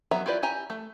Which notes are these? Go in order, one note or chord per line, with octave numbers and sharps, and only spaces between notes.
F#3 B3 E5 A#5
E4 F4 G4 B4 D5
E4 G4 G#5 A#5
A3